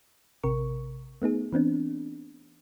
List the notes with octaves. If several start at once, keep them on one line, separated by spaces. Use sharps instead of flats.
A1 C3 A#4 C#6
A3 B3 D#4 G#4
E3 B3 C4 D4